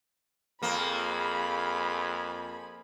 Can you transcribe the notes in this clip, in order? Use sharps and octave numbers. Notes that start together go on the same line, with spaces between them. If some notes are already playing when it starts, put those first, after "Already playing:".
F2 A#3 G#4 B5